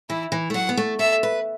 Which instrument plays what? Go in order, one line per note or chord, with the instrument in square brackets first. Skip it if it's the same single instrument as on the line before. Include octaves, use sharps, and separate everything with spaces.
[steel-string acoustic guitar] E3 [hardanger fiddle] E4
[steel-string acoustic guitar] E3
A3
[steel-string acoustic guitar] F#3 [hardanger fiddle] F#5
[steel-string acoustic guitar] B3
A3
[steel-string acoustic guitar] A4 [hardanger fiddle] E5
[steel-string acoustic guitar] B4